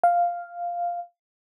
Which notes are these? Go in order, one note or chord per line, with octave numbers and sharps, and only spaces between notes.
F5